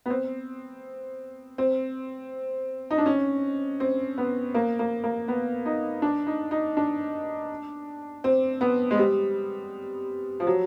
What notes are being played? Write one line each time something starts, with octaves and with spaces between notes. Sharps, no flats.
B3
C4
C4
D#4
D4
C#4
C4
B3
A#3
A#3
A#3
B3
D#4
D4
D#4
D#4
D4
C4
B3
G#3
G3
F3
F#3